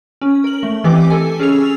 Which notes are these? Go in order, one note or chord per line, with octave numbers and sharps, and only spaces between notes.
C#4
A#4 F#7
A3
E3 C4 G4 D#5 D6
A4 G#5
C#4 G#4 A4 E6 F7